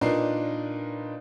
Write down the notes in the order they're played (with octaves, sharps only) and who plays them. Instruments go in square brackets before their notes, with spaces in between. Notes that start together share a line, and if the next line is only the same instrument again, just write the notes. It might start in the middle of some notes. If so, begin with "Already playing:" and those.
[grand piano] A#2 D4 D#4 A#4 B4 C7